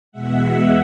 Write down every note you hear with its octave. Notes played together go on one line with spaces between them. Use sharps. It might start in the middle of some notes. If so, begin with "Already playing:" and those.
E2 B2 G#3 E5 F#5